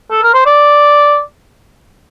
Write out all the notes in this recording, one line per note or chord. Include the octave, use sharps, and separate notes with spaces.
A4
A#4
C5
D5